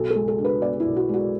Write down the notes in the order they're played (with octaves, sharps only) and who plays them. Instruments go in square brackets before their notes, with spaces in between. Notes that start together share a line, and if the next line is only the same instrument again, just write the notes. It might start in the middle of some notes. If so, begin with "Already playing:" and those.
Already playing: [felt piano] B1 A4
G#3 A4
A4
D4
B4
B2 D5
E4
B1
F#4
G#3 F#4